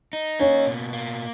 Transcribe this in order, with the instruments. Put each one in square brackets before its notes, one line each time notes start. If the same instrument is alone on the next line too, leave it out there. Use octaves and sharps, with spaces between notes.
[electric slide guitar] D#4
[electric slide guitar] A#3 [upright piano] C#4
[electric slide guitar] B2
A#3